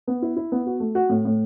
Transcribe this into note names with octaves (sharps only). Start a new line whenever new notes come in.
B3
E4
E4
B3
F#4
A3
F#4
A2
A2